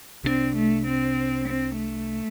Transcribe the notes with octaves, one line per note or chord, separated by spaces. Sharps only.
C2 C3 G3 C4 D4
A3
C4
C4
A3